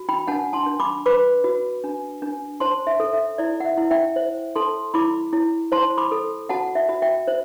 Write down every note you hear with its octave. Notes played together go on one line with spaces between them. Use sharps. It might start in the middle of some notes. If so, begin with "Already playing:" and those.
Already playing: F#4
G5 B5
D4 F#5 A5
A5 C6
D4
B5 D6
B4 B5 D6
F#4
D4
D4
C5 A5 C6
E5
A4
E5
E4 D5
F#5
E5
E4
E5 G5
C5
A4 A5 C6
E4 B5 D6
E4
C5 A5 C6
B5 D6
A4
F#4 F#5 A5
E5
F#4
E5 G5
C5